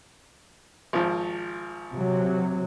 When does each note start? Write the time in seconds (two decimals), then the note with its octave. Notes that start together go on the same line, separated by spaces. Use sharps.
0.93 G#1 F3
1.93 C3 F#3